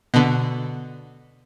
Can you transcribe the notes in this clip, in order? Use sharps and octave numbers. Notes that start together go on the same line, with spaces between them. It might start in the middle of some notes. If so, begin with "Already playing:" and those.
B2 D3